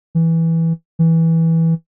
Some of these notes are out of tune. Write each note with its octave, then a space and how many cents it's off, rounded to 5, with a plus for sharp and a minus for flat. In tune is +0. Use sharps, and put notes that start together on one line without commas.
E3 -5
E3 -10